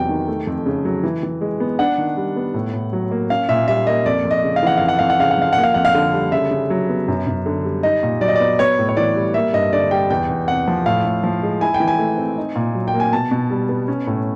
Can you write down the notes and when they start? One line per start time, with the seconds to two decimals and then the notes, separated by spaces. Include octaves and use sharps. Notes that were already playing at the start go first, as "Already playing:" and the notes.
Already playing: E2 C3 F#3 G5
0.09 D#3
0.28 A3
0.47 F2
0.66 C#3
0.85 F#3
1.03 E3
1.23 E3
1.41 G#3
1.60 B3
1.79 D4 F#5
1.98 D#3
2.17 G3
2.36 B3
2.54 A2
2.73 A2
2.93 F#3
3.11 A#3
3.30 C#4 F5
3.49 A#2 E5
3.68 G3 E5
3.87 A#3 D#5
4.06 F2 D5
4.25 F2
4.31 D#5
4.44 C#3
4.56 F5
4.63 E3 F#5
4.77 F2 F5
4.88 F#5
4.99 F2 F5
5.10 F#5
5.19 C#3 F5
5.31 F#5
5.38 F3 F5
5.53 A#3 F#5
5.63 F5
5.74 F2 F#5
5.85 F5
5.95 D3
6.13 G3
6.32 C#3 E5
6.51 C#3
6.70 F#3
6.89 B3
7.08 F#2
7.27 F#2
7.46 D3
7.65 G3
7.83 D#4 D#5
8.03 A#2
8.21 F#3 D5
8.28 D#5
8.36 B3 D5
8.59 B3 C#5
8.79 A2
8.89 C#5
8.97 E3 D5
9.16 G3
9.34 A#3 E5
9.53 G2 D#5
9.73 D3 D5
9.91 G3 G5
10.10 E2 G5
10.29 E2
10.48 C3 F#5
10.68 F3
10.86 A2 F5
11.05 A2
11.24 F3
11.43 G#3
11.61 E4 G#5
11.74 G5
11.80 E3
11.88 G#5
11.99 A3
12.18 C4
12.37 D#4
12.56 A#2
12.75 F#3
12.88 G5
12.94 A#3
13.00 G#5
13.13 B2 A5
13.31 B2
13.51 G3
13.69 B3
13.88 C#4
14.07 A2